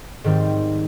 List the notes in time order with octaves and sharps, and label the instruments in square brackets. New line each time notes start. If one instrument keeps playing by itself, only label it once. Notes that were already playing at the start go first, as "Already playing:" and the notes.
[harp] G#2 D#3 G3 C4